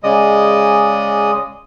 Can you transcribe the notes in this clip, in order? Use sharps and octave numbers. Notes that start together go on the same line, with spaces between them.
C#3 G#3 D5 D#5 D#6